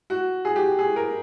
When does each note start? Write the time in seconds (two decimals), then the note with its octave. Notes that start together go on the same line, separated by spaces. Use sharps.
0.10 F#4
0.45 G#4
0.56 G4
0.79 G#4
0.96 A#4